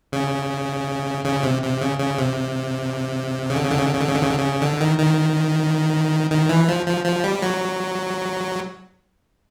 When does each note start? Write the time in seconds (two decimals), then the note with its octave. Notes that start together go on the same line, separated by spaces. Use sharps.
0.12 C#3
1.25 C#3
1.43 C3
1.63 C3
1.81 C#3
1.99 C#3
2.18 C3
3.50 C#3
3.56 D3
3.64 C#3
3.71 D3
3.79 C#3
3.86 D3
3.93 C#3
4.01 D3
4.08 C#3
4.15 D3
4.23 C#3
4.30 D3
4.37 C#3
4.62 D3
4.81 D#3
4.99 D#3
6.31 D#3
6.49 E3
6.69 F3
6.86 F3
7.05 F3
7.24 G3
7.42 F#3